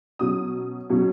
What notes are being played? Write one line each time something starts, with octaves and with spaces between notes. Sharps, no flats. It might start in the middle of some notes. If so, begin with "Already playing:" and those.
B2 F#3 C#4 D#6
B2 F#3 C#4